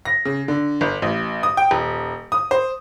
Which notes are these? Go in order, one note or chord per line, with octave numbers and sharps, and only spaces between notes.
A#6
C#3
D3
G1
A1
D#6
G5
D#1
D#6
C5